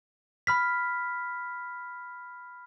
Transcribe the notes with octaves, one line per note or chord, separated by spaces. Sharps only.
B5 F6 B6